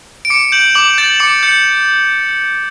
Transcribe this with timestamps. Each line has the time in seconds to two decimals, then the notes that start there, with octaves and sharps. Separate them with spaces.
0.25 D7
0.30 D6 C#7
0.52 G6 F#7
0.75 D6 F#7
0.98 G6 A6
1.20 D6 C#7
1.43 G6 C#7